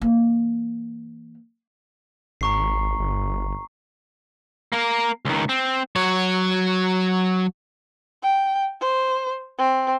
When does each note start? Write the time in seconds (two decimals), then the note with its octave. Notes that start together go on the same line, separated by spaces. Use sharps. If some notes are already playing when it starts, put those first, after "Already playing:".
0.02 E3 A#3
2.41 G#1 A#5 C#6 C7
3.00 G1
4.72 A#3 A#4
5.25 C#2 D#3
5.49 C4
5.96 F#3 C#5
8.23 G5
8.81 C5
9.58 C4